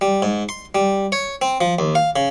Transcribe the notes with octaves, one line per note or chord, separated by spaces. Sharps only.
G3
G#2
C6
G3
C#5
C4
F3
D#2
F5
C#3